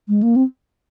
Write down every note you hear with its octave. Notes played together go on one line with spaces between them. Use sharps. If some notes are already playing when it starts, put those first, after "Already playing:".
G#3
A#3
C4